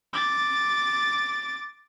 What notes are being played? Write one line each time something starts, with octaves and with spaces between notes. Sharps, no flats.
D6 A6